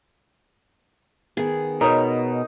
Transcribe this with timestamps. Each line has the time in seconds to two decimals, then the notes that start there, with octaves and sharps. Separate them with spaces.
1.37 D#3 B3 G#4
1.81 B2 D#4 A#4 C#5